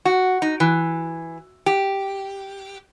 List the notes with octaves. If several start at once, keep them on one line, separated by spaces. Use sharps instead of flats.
F#4
D#4
E3
G4